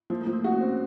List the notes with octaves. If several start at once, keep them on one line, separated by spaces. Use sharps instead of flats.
F3 A#3
A3
F3
A#3
C4 F#4
C#4
C4
C#4